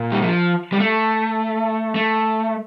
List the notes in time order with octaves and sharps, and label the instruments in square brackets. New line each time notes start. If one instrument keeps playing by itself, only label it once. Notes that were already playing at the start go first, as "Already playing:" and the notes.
Already playing: [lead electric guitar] A#2
G3
F3
G3
A3
A3